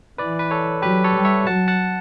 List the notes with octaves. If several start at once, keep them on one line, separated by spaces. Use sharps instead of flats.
E3 B4 D5
B4
A4 C#5
F#3 G4 B4
A4 C#5
G3
C#5 E5
F#3 F#5 A5
F#5 A5